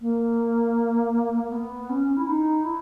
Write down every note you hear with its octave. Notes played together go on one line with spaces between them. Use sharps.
A#3
A#3
B3
C#4
E4
D#4
E4